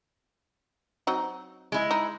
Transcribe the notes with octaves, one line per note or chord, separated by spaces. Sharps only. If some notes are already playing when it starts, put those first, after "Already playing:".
F#3 C4 D#4
G#3 E4
D#4